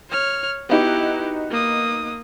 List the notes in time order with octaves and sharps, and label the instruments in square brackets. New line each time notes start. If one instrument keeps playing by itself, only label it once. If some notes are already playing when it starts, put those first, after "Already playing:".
[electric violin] C#5 F6
[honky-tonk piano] B3 D#4 F#4 [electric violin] E4 G4
[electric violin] A#3 D#6